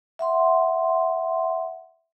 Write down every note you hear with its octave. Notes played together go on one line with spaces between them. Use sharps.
E5 F#5 C6